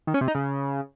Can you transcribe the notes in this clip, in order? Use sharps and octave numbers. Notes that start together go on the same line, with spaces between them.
D#3
C#4
C3
D#4
C#3